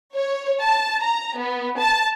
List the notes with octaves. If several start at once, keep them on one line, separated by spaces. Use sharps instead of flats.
C#5
A5
A#5
B3
A5